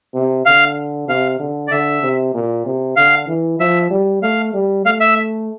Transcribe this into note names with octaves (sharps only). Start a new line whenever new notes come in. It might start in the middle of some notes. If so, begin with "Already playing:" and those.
C3
D3 F5
C3 F5
D3
D5
D3 E5
C3
A#2
C3
D3 F5
E3
F3 E5
G3
A3 F5
G3
A3 F5
E5